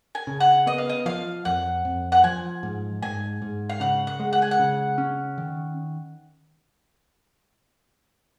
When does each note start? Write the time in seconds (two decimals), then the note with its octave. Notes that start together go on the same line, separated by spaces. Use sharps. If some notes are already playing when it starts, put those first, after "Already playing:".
0.15 G#5
0.27 C#3
0.40 F#5
0.66 B3 D#5
0.78 F5
0.89 D#5
1.06 F3 F5
1.45 F2 F#5
1.85 F2
2.12 F#5
2.24 F3 G#5
2.63 G#2
3.02 G#2 G#5
3.42 G#2
3.70 F5
3.80 C#3 F#5
4.07 F#5
4.20 G#3
4.33 F#5
4.42 G#5
4.51 F#5
4.59 C#3
4.98 C#4
5.38 D#3